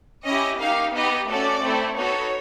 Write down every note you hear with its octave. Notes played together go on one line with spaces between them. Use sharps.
C#4 E4 G4 D#5
A#3 D#4 G4 F5
B3 D#4 G4 D#5
A3 C#4 F#4 A4 D5
A3 C4 E4 A4
B3 D#4 F#4 A4 C#5